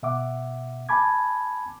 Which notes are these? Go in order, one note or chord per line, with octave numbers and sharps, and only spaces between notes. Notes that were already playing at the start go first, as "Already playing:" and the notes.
B2 E5 F#5 D6
G#5 A5 B5 D6 G#6